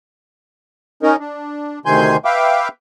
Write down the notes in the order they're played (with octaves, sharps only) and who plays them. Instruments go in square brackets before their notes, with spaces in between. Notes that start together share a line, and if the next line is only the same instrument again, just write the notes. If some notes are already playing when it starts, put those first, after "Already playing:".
[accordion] C#4 D#4 A#4
D4
D2 C3 D#3 G#5 C6 G6
B4 E5 F5 G5 D6